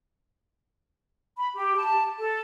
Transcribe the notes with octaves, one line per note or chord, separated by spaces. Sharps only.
B5
G4
A5
A4